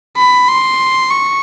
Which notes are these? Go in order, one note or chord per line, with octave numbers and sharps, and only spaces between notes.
B5
C6
C#6